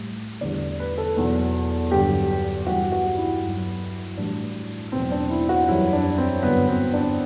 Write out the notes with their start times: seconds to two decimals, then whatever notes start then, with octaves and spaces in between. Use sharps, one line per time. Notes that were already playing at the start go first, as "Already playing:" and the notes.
Already playing: A2 G3
0.41 E2 D3 G3 D5
0.80 B4
0.98 A4
1.17 E2 B2 F#3
1.91 G2 D3 F#3 G4
2.67 G2 E3 G3 F#4
2.92 F#4
3.17 E4
3.43 G2 F#3
4.17 A2 E3 G3 D4
4.92 E2 B2 F#3 C4
5.12 D4
5.30 E4
5.49 F#4
5.68 F#2 E3 G3 E4
5.93 D4
6.18 C4
6.43 G2 D3 F#3 B3
6.68 C4
6.94 D4